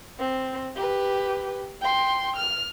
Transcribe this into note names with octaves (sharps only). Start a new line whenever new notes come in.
C4
G4 B4
G5 C6
F6